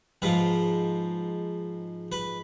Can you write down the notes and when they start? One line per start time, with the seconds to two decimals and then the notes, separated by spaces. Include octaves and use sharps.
0.22 G#2 F3 B4
2.12 B4